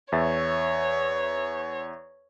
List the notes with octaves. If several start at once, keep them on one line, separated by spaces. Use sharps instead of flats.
E2 C#5 E5 A6